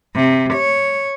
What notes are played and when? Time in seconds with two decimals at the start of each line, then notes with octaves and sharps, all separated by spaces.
0.16 C3
0.54 C#5